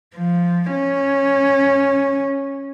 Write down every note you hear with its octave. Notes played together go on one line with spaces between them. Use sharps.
F3
C#4